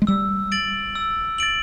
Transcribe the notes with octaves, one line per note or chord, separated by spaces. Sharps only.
G#3
G3 E6
A6 D7 F#7
E6
A6 D7 F#7